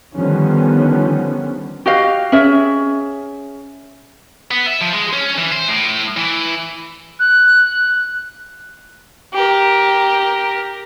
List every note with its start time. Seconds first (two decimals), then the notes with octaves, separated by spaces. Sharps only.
0.15 D3 D#3 F3 G3 B3 C#4
1.86 F#4 G4 D#5 F5
2.32 C#4 G#4 E5
4.51 B3
4.67 E5
4.81 F3
4.93 G#3
5.13 C#4
5.38 E3
5.52 C5
5.68 A2
6.17 E3
7.19 F#6
9.33 G4 A#4